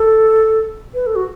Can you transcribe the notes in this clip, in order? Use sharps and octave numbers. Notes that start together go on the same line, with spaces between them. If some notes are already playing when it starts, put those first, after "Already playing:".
Already playing: A4
B4
A4
F#4